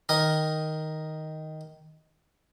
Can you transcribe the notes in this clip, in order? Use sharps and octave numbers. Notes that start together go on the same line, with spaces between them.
D#3 A#4 D#5